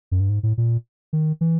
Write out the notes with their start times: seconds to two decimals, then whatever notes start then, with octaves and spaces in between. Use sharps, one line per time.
0.12 F#2
0.20 G2
0.29 G#2
0.43 A2
0.58 A#2
1.13 D#3
1.41 E3